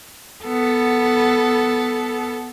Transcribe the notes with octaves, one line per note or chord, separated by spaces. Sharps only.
B3 A4